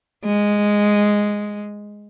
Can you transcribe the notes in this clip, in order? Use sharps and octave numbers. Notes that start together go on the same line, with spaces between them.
G#3